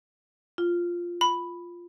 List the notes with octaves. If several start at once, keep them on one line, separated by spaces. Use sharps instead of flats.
F4
B5